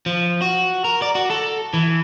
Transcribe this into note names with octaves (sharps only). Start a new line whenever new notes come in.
F3
F#4
A#4
D5
F#4
A4
E3